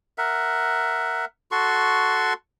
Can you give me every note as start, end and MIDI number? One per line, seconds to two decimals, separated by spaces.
0.18 1.25 70
0.18 1.25 76
0.18 1.25 78
1.51 2.33 66
1.51 2.33 69
1.51 2.33 84
1.51 2.33 85